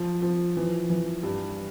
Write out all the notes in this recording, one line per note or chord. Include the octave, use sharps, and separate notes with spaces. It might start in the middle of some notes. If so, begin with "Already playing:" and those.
Already playing: F3
F3
E3
E3
G2